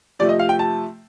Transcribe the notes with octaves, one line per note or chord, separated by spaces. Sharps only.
C3 F3 A3 D5
D#5
F5
G5
A5